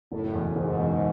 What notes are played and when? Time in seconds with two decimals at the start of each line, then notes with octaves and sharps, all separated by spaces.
0.12 F#1 A2
0.34 E2 B2
0.56 F#1 G#2
0.78 E2 B2